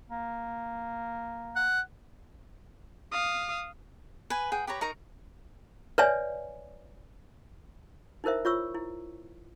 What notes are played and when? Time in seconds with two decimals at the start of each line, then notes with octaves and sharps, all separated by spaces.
0.10 A#3
1.56 F#5
3.12 F5 D#6
4.30 B4 G#5
4.52 G#4 F#5 G5
4.67 G4 B4 C#5 A#5
4.81 D#4 A#4 A#5 C#6
5.98 B4 C#5 D5 E5 G#5
8.24 D#4 E4 A#4 C5 E5
8.45 F4 C#5 C#6 E6
8.75 E4